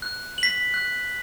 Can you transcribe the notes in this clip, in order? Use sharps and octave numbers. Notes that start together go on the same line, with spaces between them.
F#6
B6 F#7
F#6